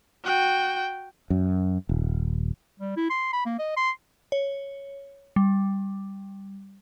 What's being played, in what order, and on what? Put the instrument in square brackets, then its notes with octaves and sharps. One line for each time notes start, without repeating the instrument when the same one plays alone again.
[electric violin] F#4 G5
[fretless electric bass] F#2
D#1
[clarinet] G3
E4
C6
B5
A#3
D#5
C6
[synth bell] C#5
G3